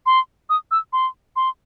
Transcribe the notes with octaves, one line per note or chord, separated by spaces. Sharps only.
C6
D#6
E6
C6
C6